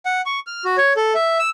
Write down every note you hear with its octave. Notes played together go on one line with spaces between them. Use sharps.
F#5
C#6
F6
F#4
C#5
A4
E5
E6